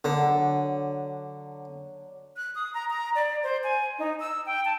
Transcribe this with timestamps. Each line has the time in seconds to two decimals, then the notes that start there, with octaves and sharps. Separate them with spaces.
0.04 D3 F#3 D4
2.37 F#6
2.55 D#6
2.74 A#5
2.90 A#5
3.15 D5
3.43 C5
3.64 G#5
3.99 D#4
4.20 E6
4.46 G5
4.65 A5